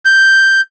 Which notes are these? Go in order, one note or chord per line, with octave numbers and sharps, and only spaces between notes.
G6